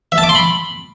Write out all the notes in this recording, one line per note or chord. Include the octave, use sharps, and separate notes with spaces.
E5
A5
D6
C6
B5